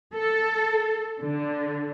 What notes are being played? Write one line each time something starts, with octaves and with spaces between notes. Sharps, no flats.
A4
D3